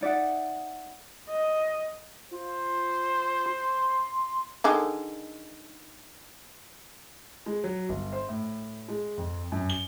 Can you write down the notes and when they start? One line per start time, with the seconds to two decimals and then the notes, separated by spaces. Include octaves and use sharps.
0.01 D#4 D5 E5 F#5
1.30 D#5
2.31 F4 C5
3.46 C6
4.64 D3 D#3 G#3
7.46 G#3
7.64 F#3
7.89 G1
8.13 C5
8.29 A2
8.88 G#3
9.17 F2
9.52 F#2
9.70 G7